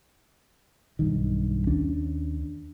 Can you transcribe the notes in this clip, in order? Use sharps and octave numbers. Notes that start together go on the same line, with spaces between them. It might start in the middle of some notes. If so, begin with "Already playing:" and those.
B1 G2 D#3
D#2 C#4 D4